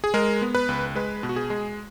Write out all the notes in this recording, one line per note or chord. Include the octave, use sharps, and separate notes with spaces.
G#4
G#3 A#4
B3
B4
C#2
G#3 B4
B2
F#4
G#4
G#3